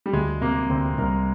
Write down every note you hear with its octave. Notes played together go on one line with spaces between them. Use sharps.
G3
D2 G#3
C3 A#3
D2 C4
C2 A#4